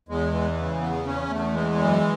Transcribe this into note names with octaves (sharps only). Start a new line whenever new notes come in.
E2 G#3
E3
C#3
E2 B3
E2 C#4
E2 A3
E3 G#3
F#2